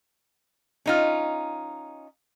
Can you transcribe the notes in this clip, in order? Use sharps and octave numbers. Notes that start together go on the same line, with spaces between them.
C#4 D#4 F4